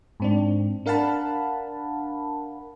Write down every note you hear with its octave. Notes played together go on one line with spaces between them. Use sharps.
G#2 C4 D4
D4 A#4 F5 F#5 A5 B5